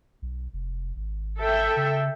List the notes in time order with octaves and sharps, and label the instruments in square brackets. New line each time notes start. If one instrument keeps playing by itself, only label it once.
[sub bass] B1
F1
G#1
[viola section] A4 E5 G5
[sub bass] C#3